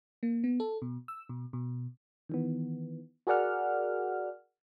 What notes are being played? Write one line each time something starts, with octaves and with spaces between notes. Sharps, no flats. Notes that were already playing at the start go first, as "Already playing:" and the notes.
A#3
B3
A4
B2
E6
B2
B2
D#3 E3 B3
F#4 G#4 A#4 D5 F#5 F6